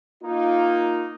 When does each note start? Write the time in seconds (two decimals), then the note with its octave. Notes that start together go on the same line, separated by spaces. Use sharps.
0.22 A#3 D#4 F4